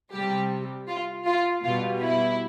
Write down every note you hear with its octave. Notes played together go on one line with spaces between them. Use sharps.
C3 G3 G4
F4
F4
B2 G3 F4
E4